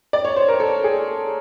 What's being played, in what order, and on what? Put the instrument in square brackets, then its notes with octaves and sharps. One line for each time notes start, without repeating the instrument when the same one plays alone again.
[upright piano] D5
C#5
C5
A#4
A4
G#4